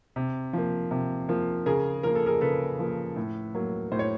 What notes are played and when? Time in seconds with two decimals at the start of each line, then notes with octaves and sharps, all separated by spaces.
0.16 C3
0.53 F3 A#3
0.91 C3
1.29 F3 A#3
1.66 C#3 G#4 A#4
2.03 F3 A#3 A#4
2.15 A4
2.26 G#4 A#4
2.41 C#3 A4 B4
2.79 F3 A#3
3.16 A2
3.55 F#3 A#3
3.92 A2 C5
3.99 C#5